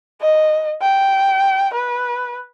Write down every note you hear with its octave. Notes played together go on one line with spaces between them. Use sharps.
D#5
G5
B4